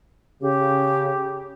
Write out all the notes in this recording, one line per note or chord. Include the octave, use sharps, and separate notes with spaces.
C#3 G4